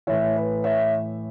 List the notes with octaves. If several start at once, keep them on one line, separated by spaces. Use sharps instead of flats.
A2 E3 C#5 E5
B4
C#5 E5